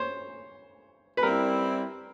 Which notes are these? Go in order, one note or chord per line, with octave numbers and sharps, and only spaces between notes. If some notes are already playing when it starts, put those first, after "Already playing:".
Already playing: C5 C#5
B4
G3 C4 E4 A#4